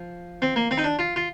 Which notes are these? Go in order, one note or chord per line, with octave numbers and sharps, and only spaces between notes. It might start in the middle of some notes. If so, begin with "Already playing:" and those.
Already playing: F3
C4
A#3
C4
D#4
D4
F4
F4